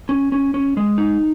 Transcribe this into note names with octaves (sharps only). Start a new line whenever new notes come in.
C#4
C#4
C#4
G#3
D#4